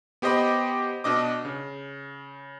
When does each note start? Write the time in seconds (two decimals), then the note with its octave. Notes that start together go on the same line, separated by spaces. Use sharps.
0.22 B3 G4 C5 D#5 G5 B5
1.04 B2 D4 D#5 D6
1.45 C#3